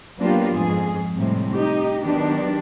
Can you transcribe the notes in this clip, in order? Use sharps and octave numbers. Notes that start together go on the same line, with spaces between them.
F#3 A#3 B3 D4 F4 G4
F2 G#2 G#4
A2 C3 G3 G#3
D#4 G4
D#3 F#3 B3 D4 G4